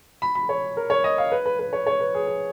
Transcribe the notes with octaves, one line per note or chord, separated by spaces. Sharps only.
B5
B5
C#5
A#4
C#5
D#5
F5
B4
B4
B4
C#5
C#5
B4
G#4
G#4